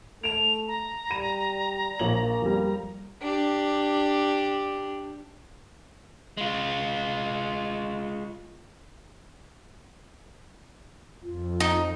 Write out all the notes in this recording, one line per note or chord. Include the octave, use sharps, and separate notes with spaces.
A3 D7 E7 F7
A#5
G3 B5 D#7
A#1 A#3 C#5 F#7
F2 G3
D4 G4
G#3 F4
F2 F4
D#4